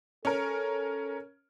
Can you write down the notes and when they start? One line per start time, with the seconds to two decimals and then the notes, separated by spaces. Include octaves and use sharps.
0.25 C#4 A4 A#4